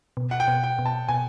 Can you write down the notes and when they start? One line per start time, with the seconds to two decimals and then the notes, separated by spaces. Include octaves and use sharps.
0.17 B2
0.31 F#5
0.40 G5
0.48 B2
0.64 G5
0.79 B2
0.86 A5
1.09 B2 G#5